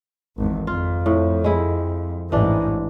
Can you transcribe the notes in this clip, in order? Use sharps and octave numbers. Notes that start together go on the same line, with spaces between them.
G#1 E2
F2 F4
A2
G#3 E4
A1 G#2 E3 D4